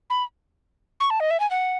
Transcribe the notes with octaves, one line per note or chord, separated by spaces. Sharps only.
B5
C#6
A5
D#5
E5
G#5
F#5